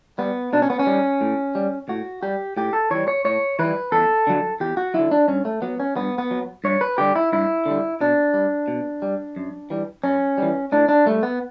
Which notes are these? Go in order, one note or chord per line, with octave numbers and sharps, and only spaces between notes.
G3 B3
B2 D4
C#4
B3
C#4
G3
A2
G3
A2 F#4
G3 G4
A2 G4
A4
E3 G3 C#5
C#5
A2 C#5
E3 G3 B4
E2 A4
D3 F#3
E2 G4
F#4
D3 F#3 E4
D4
G2 C#4
A3
F#3 B3
C#4
G2 B3
B3
F#3
G2 C#5
B4
D3 G3 G4
E4
G2 E4
D3 G3
B2 D4
G3
B2
G3
F#2
E3 G3
F#2 C#4
E3 G3
A2 D4
D4
G3 A3
B3